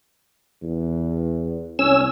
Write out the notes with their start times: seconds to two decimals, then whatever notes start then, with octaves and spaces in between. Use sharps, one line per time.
0.63 E2
1.79 C2 C#4 E6